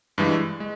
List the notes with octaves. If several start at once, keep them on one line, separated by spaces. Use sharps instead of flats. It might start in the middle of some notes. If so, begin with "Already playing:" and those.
G2 E3 G#3
G#3